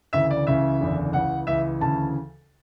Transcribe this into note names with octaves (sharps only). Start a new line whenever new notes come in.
D2 C#3 E3 E5
D5
C#2 C#3 E3 E5
F#1 E2 D3
C#2 C#3 E3 F#5
C#2 C#3 E3 E5
D2 C#3 E3 A5